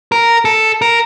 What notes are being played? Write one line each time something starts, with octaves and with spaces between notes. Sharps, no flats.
A#4
A4
A#4